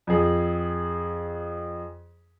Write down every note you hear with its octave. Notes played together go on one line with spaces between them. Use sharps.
F2 G#4